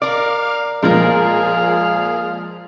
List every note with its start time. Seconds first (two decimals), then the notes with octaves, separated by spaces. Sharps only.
0.02 A#4 D5 F5 D6 F6
0.82 A#2 F3 G#3 A#3 G#4 A#4 F5